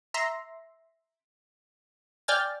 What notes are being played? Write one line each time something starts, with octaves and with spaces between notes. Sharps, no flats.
E5 A#5 C6
D5 G5 G#5 F6 A6